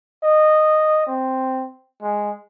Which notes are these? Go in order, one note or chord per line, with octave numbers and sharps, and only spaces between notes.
D#5
C4
G#3